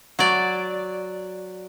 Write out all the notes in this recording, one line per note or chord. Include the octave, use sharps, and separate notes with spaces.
F#3 D5